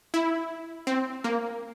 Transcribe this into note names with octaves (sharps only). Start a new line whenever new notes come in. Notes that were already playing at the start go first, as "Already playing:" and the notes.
E4
C4
A#3